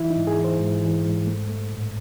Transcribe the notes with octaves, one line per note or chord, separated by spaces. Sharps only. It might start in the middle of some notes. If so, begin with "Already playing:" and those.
Already playing: E3 E4
D#4
G#2
G#4
E3
C5
G#2
E3
G#2
A3
A3
A2